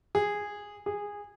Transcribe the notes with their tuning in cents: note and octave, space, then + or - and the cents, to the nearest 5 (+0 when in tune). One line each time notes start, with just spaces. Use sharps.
G#4 -10
G#4 -15